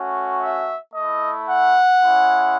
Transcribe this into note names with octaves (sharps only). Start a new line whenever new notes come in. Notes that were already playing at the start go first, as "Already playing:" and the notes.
Already playing: A3 C#4 F#4
E5
A3 E4 D#5
F#5
G#3 C#4 E4